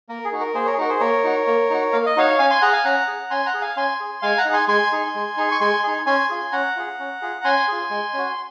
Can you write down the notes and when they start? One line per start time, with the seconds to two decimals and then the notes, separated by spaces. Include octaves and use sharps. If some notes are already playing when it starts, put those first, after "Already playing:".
0.09 A#3 A#4
0.25 G#4
0.32 D#4 F#4
0.40 A#4
0.54 A#3 G#4 C5
0.66 A#4 C#5
0.73 G#4
0.78 D#4 F#4 A#4
0.89 G#4 C5
1.00 A#3 A#4 C#5
1.24 D#4 F#4
1.47 A#3
1.70 D#4 F#4
1.93 A#3 F5
2.06 D#5
2.16 D#4 F#4 C#5 F5
2.39 C#4 F5 G#5
2.50 G#5 C6
2.61 G#4 F#5 A#5
2.73 F5 G#5
2.84 C#4 F#5 A#5
3.08 G#4
3.30 C#4 G#5 C6
3.46 F#5 A#5
3.54 G#4
3.61 F5 G#5
3.76 C#4 G#5 C6
4.00 G#4
4.22 G#3 F5 G#5
4.38 F#5 A#5
4.45 D#4 G#4
4.53 G#5 C6
4.68 G#3 G#5 C6
4.92 D#4 G#4
5.15 G#3
5.37 D#4 G#4
5.51 C#6
5.61 G#3 G#5 C6
5.83 D#4 G#4
6.06 C#4 G#5 C6
6.29 F4 G#4
6.52 C#4 F#5 A#5
6.76 F4 G#4
6.99 C#4
7.22 F4 G#4
7.44 C#4 G#5 C6
7.68 F4 G#4
7.90 G#3
8.13 C#4 F#4